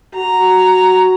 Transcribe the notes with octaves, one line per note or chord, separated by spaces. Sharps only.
F#4 A#5